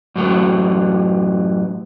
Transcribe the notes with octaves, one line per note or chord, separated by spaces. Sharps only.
F#2 A2 F#3